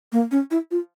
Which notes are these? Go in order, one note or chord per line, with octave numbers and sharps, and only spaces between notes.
A#3
C#4
E4
F4